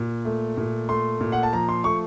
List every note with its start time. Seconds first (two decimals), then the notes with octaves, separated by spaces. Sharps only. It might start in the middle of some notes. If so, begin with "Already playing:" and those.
Already playing: A#2
0.25 A3
0.57 A#2
0.89 A3 C6
1.21 A#2
1.32 F#5
1.43 A5
1.53 F3 A#5
1.69 C6
1.84 A3 C#6